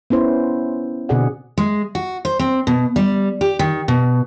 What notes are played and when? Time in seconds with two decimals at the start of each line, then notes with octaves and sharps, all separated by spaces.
0.10 B3 C#4 E4 C5
1.09 B2 D3 C4 G#4 D5 F#5
1.58 G#3
1.95 F#4
2.25 C5
2.39 C4
2.67 B2
2.96 G3
3.41 G4
3.59 D#3
3.88 B2